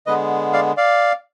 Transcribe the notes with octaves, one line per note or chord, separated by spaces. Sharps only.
D3 G#3 B3 B4 D#5
D5 F5
D5 F5